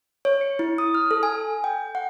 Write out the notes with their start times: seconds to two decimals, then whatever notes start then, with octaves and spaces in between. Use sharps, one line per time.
0.25 C#5
0.41 C#7
0.59 E4
0.78 D#6
0.95 F6
1.11 A4
1.23 G#5
1.64 G5
1.95 F#5